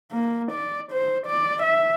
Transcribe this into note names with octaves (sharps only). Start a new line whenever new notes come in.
A#3
D5
C5
D5
E5